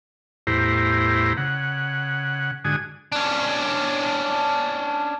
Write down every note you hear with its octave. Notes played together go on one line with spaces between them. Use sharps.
E2 A2 E4 G4 C5 A#5
C#3 F#5
G#2 D3 F#4 G#5 D#6
C#4 D4